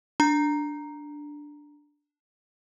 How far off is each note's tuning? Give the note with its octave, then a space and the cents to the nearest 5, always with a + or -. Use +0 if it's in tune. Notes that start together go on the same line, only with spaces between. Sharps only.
D4 +0 A#5 +0